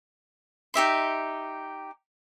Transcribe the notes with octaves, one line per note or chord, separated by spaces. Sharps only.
D#4 G4 E5 C6